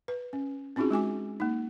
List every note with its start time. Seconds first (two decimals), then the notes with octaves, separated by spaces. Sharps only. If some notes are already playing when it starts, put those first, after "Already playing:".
0.08 B4
0.33 C#4
0.76 C4 C#4 D#4 F4 F#4 G#4
0.91 G#3 F#4 G#5 D6
1.40 A#3 D#4